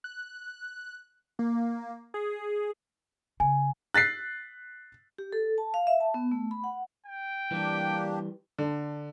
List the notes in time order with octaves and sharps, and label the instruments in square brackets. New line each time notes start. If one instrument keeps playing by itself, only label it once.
[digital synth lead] F#6
A#3
G#4
[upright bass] C#3 [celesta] G#5
[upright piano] F#6 A6 B6 C7
[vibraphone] G4
A4
A5
F5
E5
A5
B3
A3
B5
F#5
[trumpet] G5
[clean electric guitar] E3 G3 [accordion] A#3 D4 G4
[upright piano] D3